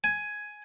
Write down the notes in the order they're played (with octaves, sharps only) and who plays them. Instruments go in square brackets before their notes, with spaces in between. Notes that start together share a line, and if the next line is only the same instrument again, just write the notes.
[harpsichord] G#5